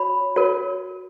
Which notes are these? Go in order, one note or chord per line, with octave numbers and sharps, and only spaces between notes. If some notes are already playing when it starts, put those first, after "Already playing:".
Already playing: F#4 C#5 B5
F#4 A#4 C#5